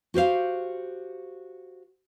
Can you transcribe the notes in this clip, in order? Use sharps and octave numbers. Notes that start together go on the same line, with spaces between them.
F#4 G4 C5 F5